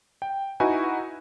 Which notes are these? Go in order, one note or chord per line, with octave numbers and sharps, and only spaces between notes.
G5
D#4 E4 F#4 B4 G#5